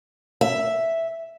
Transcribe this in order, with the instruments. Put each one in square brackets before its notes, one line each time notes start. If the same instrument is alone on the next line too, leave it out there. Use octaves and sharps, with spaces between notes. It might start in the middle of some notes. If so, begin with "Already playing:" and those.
[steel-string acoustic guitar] E5